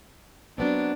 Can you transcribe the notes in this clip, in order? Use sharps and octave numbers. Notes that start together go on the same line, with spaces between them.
F#3 B3 C4 D4